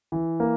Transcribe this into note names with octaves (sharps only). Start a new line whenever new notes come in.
E3
A#3